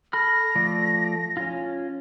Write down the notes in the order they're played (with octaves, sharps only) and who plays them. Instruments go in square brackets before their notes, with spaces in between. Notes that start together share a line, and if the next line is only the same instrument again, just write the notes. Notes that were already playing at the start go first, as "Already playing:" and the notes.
[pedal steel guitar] A4 B5 F6 [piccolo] A#6
[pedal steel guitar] F3 A3 D5
C#4 F4